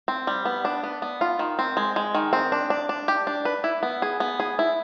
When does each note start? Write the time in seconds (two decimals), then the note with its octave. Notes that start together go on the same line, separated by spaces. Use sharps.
0.08 C4
0.27 G3
0.45 B3
0.65 D4
0.83 B3
1.02 B3
1.21 F4
1.39 D#3
1.59 C4
1.77 G#3
1.96 G#3
2.15 D#3
2.33 C4
2.52 D4
2.70 D4
2.89 D4
3.08 G4
3.27 D4
3.45 B4
3.64 E4
3.83 B3
4.02 G#4
4.20 B3
4.40 G#4
4.59 E4